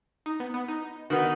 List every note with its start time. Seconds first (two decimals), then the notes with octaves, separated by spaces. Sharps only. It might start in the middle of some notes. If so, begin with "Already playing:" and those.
0.26 D#4
0.40 B3
0.54 B3
0.68 D#4
1.10 D#3 B3 D#4 F#4